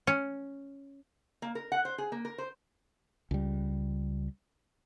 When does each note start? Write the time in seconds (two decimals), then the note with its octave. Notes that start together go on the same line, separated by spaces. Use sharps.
0.07 C#4
1.42 A#3
1.55 A#4
1.72 F#5
1.85 C5
1.98 G#4
2.12 A#3
2.25 A#4
2.38 C5
3.31 C#2 G3